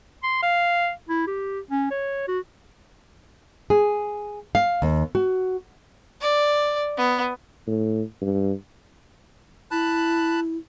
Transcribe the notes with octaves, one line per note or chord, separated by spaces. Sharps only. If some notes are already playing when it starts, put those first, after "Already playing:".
C6
F5
E4
G4
C#4
C#5
F#4
G#4
F5
D#2
F#4
D5
B3
A2
G2
E4 A5 B5 F#6